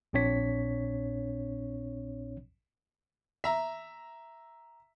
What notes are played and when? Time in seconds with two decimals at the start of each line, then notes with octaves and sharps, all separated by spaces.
0.13 A#1 A#2 C4 D4 C#5 B6
3.44 E5 A#5